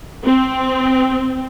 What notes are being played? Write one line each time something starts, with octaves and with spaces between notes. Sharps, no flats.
C4